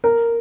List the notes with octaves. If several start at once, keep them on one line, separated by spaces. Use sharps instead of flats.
A#4